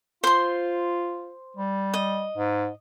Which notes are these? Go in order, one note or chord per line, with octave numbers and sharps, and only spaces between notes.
F4 C5 C6
G3
D#5
G#2